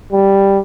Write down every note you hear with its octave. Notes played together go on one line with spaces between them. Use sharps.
G3